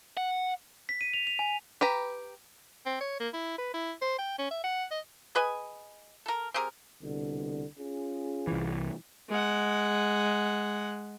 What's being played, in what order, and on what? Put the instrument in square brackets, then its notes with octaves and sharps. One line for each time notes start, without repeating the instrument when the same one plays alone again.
[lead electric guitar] F#5
[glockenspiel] B6
D#7
F7
F7
G#5
[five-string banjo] G4 B4 A#5
[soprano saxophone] C4
C#5
A#3
E4
B4
E4
C5
G5
C#4
E5
F#5
D#5
[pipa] G#4 B4 D#5 G#5
A4 A#4
C4 G4 G#4 A#4
[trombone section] C2 B2 D3
C#4 F4 G#4
[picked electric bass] C2 E3
[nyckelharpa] G#3 F#5